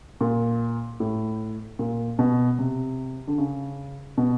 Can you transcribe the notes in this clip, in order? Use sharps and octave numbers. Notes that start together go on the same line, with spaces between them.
A#2
A2
A#2
B2
C3
D3
C#3
B2